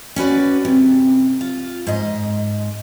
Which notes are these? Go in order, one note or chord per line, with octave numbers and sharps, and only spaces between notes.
C#4 F#4 B4 D5
C3
F4
G#2 D#5